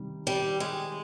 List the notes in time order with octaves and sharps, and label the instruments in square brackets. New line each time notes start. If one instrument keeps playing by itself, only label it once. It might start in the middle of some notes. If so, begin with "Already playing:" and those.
Already playing: [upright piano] C3 D#3 G3
[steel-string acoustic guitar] G3
G#3